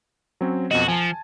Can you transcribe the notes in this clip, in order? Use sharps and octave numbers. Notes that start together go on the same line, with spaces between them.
F#3 C4 C#4
F2 B2 F#4 D#5
F3 G#5 A5